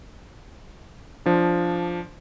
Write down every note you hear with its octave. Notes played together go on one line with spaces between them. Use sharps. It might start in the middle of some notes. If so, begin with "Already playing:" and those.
F3 D4